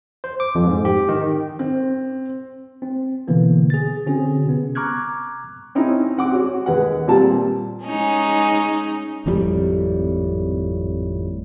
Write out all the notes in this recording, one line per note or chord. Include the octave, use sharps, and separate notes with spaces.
C5
D6
F2
G#2
G4
D#3
C4
C4
B2 D3 E3 A#3 B3
G#4 A6
D3 C4 C#4 F#4 G#4
C3 B3
A#5 C#6 D6 F6 F#6 G#6
C4 C#4 D#4 E4
C4 F#5 D6
F#4 C#5
D#2 G#3 B4 F#5
A#2 G3 C4 A5
G#3 C#4 D#4
G#1 F2 A2 G3